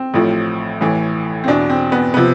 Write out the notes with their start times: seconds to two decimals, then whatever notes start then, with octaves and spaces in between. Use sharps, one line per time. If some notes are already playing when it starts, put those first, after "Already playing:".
Already playing: C4
0.14 A1 A2 F3
0.81 A1 A2 E3
1.44 C4
1.48 E2 B2 D4
1.70 C4
1.92 B3
2.14 C3 F3 B3